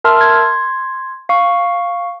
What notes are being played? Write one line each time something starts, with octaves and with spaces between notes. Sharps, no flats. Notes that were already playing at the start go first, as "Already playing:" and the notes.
A#4 E5 A5 C6 E6 F6
C6 G#6
F5 C#6